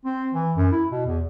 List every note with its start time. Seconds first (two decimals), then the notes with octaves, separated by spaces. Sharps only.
0.05 C4
0.34 E3
0.56 F#2
0.72 E4
0.91 B2
1.06 E2